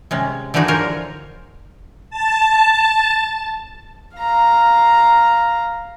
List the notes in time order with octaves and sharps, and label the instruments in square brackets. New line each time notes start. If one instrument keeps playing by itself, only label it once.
[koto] C3 G#3 C#4
D3 E3 F3 D#4 F#4 G#4
F4 A#4 C5 C#5
[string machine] A5
[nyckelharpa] F5 A#5